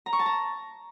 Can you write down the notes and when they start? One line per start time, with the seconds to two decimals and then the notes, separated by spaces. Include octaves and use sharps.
0.06 A#5
0.13 C#6
0.19 A5
0.26 A#5